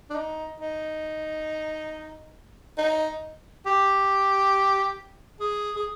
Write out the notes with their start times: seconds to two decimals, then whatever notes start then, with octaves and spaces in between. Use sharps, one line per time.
0.10 D4
0.15 D#4
0.60 D#4
2.78 D#4
3.66 G4
5.40 G#4
5.76 G#4